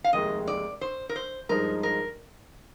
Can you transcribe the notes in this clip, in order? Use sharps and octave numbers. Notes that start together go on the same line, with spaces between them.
F5
F1 D#2 D#3 G#3 D#5
D5
C5
A#4
C5
G2 F3 G#3 D#4 A#4
A#4